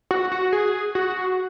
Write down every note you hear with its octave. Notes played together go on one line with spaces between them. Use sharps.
F#4
F#4
G#4
F#4